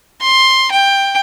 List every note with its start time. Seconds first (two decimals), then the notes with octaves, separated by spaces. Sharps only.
0.21 C6
0.71 G5